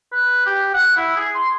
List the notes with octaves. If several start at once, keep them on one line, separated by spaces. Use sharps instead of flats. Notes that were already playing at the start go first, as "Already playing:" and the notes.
B4
G4
F#5
E4
G#4
C6